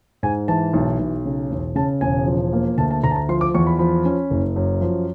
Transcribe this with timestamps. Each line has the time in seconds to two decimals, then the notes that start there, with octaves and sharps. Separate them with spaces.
0.23 G#2 G#5
0.48 E3 A5
0.73 B1
0.99 B1
1.25 C#3
1.50 E1
1.75 C#3 A5
2.01 E1 G#5
2.27 F3
2.53 A#3
2.78 D2 A5
2.91 A5
3.04 D2 A#5
3.11 A5
3.16 A#5
3.29 F3 C6
3.41 D6
3.54 E2 C#6
3.67 B5
3.79 F3 B5
4.05 C#4
4.30 F#1
4.56 F#2
4.81 F3